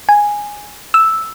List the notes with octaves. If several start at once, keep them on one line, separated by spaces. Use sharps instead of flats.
G#5
E6